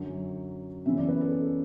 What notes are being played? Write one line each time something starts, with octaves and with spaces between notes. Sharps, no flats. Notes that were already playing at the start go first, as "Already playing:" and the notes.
Already playing: F#2 D3 F#3 C#4
F#2 C#3 E3 B3 E5
D5
B4
A4